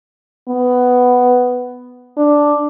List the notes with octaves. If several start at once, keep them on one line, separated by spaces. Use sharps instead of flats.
B3
D4